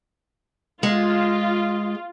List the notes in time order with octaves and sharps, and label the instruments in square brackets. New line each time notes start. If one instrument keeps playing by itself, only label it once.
[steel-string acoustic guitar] G#3 [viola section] F4